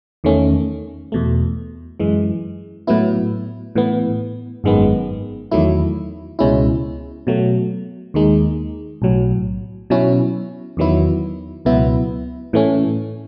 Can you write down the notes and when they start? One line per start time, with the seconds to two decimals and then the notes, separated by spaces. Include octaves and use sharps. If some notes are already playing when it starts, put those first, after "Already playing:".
0.24 E2 D#3 A3 C#4
1.12 E2 B2 A3
2.00 F#2 E3 G#3
2.87 A2 F#3 B3 E4
3.75 A2 E3 B3
4.64 G#1 F#2 D#3 G#3 B3
5.51 E2 D#3 F#3 A3 E4
6.39 C#2 B2 G#3 C#4 E4
7.27 B2 F#3 A3
8.14 D#2 D#3 G#3 D#4
9.02 B1 A2 F#3
9.90 B2 F#3 C#4 E4
10.77 E2 D#3 F#3 B3 E4
11.65 C#2 B2 F#3 B3 E4
12.53 A2 E3 A3 C#4